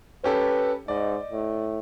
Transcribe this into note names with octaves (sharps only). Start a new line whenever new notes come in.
C#4 G4 A4 B4
G#2 D5 D#5
A2